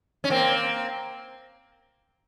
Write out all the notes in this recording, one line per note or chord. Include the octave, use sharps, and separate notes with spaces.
C#4
A#3 C4